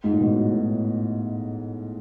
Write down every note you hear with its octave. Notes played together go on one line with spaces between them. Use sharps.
G#2
A2
B2
A2